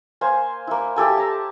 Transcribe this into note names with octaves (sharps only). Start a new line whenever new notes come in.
A#3 C5 F5 G#5
A#3 E4
E4 G4 A4 G#5
A5 A#5